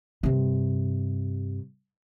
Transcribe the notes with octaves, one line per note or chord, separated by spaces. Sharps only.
G2 C3